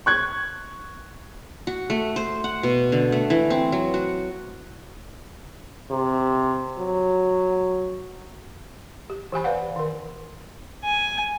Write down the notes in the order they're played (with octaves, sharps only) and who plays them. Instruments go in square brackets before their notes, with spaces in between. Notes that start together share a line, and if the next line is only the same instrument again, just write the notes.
[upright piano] C#6 F#6 G#6
[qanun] F#4
A3
C5
F#5
B2
D3
A3
E3
C4
F#3
F#4
[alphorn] C3
F#3
[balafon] G4
E3 G4 G#5 B5
B4 D5 F5 F#5
D#3 A#4
[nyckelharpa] G#5